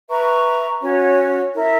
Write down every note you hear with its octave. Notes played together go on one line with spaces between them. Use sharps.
B4 E5 A#5 C#6
C#4 F#4 C#5
E4 A#4 E5